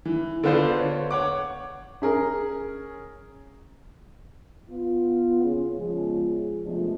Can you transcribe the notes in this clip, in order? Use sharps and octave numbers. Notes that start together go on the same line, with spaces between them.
E3
D3 B3 F4 C5 D5
C#5
C#5 F#5 D6
C#4 G#4 A#4
B3 F4
C#3
C#3 F3 G#3 B3 F4 G#4
C3 F3 G#3 A3 B3 D4